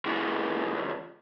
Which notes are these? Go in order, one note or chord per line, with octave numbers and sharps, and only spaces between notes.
C#2 E3